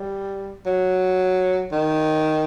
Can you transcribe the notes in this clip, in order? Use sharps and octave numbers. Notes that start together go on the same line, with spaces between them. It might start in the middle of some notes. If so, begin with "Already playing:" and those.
Already playing: G3
F#3
D#3